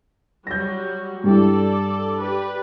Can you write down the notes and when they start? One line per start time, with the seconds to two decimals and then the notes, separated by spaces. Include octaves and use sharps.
0.47 F#3 G3 F#4 G6 A#6
1.24 G2 G3 E4 A4 D5
2.21 G4 B4 D5